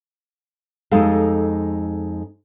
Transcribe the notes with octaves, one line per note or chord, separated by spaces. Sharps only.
F2 G#3 D#4 G4 A4 F5